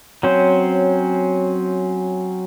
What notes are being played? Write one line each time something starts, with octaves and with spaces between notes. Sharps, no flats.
F#3 C4 C#4 C5